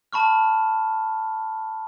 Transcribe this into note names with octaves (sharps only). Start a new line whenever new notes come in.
A5 B5 C#6 F6